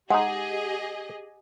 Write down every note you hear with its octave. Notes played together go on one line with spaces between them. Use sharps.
G#3 D#4 G4 G#4 D#5 F#5